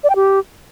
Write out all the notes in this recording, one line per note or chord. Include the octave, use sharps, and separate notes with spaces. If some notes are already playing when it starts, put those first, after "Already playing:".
D5
G5
G4